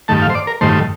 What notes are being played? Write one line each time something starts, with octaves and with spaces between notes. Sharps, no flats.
G2 D#3 A3 A5
F5
C5
D5
A#4
G2 D#3 A3 C5